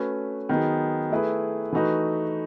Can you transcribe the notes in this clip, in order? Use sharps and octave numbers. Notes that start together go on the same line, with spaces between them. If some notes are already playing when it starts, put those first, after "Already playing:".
Already playing: A3 C#4 F#4 B4
D#3 F#3 B3 D#4 G#4
A3 E4 G#4 B4
E3 A3 D#4 F#4 B4